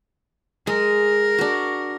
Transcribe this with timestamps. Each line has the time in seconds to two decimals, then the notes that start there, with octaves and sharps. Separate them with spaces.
0.67 G#3 A#4
1.38 D4 F#4